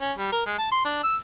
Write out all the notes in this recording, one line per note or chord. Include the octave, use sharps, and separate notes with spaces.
C#4
G3
A#4
G#3
A5
C6
D4
E6